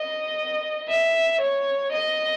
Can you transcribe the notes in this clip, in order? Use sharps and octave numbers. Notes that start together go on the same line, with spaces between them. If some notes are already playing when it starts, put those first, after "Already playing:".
Already playing: D#5
E5
C#5
D#5